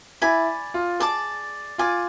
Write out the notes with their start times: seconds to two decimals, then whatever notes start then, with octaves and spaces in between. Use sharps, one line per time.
0.22 E4 D5 G#5 B5
0.74 F4
1.00 G#4 D5 A5 D6
1.78 F4 D5 G#5 D6